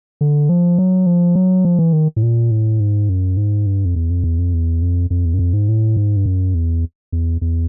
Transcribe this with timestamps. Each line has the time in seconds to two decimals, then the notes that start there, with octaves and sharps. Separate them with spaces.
0.21 D3
0.49 F3
0.78 F#3
1.06 F3
1.35 F#3
1.65 F3
1.79 E3
1.93 D#3
2.16 A2
2.23 A#2
2.51 A2
2.80 G#2
3.09 F#2
3.37 G#2
3.66 G2
3.85 F2
3.96 E2
4.10 F2
4.24 E2
4.38 F2
4.54 E2
4.82 F2
5.10 F2
5.25 E2
5.34 F#2
5.39 F2
5.53 G#2
5.69 A2
5.97 G#2
6.16 G2
6.26 F#2
6.54 E2
7.12 E2
7.41 E2